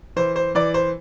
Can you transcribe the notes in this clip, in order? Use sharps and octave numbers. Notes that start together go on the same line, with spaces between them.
E3 C5
C5
E3 D5
C5